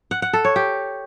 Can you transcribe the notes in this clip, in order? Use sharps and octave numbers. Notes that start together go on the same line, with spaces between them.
F#5
F#5
A4
C#5
G4